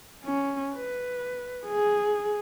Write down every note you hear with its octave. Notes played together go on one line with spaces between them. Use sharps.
C#4
B4
G#4